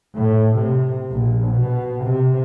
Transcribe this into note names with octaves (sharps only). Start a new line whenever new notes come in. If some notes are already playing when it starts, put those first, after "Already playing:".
A2
C3
A#1
B2
C3